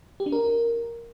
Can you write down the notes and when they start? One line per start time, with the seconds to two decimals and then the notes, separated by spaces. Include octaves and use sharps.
0.20 G4
0.26 D4
0.32 A#4